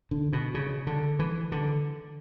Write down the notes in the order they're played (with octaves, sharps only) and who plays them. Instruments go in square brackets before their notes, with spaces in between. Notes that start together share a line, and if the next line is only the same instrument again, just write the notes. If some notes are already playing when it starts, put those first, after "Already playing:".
[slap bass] D3
B2
C#3
D3
E3
D3